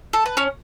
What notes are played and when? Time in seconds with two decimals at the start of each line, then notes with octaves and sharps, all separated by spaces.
0.13 A4
0.26 B4
0.37 C#4 C#5